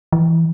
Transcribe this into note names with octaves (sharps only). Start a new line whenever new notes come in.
E3